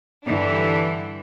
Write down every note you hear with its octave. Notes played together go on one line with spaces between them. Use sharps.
G2 D3 E3 D4